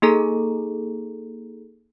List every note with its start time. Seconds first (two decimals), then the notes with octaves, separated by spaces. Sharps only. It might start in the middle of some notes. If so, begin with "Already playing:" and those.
0.02 A#3 D#4 G#4 A4 A#5